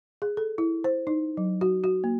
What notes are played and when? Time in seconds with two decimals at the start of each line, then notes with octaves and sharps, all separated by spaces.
0.22 G#4
0.37 A4
0.58 E4
0.84 C5
1.07 D#4
1.37 F#3
1.61 F#4
1.84 F#4
2.04 A#3